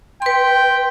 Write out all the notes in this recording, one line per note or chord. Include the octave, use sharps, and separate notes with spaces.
B4 G5 C6